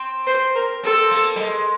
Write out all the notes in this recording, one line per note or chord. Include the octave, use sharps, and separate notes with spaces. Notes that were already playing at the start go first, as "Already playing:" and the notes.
Already playing: C4
C5
A#4
C4 A4
A#3
G3
G#3